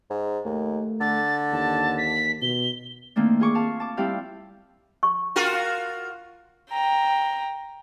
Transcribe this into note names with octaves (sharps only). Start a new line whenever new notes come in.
G#2
D#2 A3
D3 A6
D#2 A5
B6
B2 G7
D#3 A3 A#3 C4 D4
F4 G#4 C#6 D6
F5 A5
A5 D6
G3 C4 E4 G4 E5 F5
C#6
F4 F#4 A#4
G5 A#5